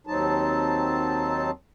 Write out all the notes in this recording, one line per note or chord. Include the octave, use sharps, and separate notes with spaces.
D#2 F#3 C4 D#4 A5